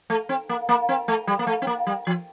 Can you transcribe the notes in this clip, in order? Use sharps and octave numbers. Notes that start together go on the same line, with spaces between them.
A3
C4
A#3
A#3
C4
A3
G3
A#3
A3
C4
A#3
G3
F3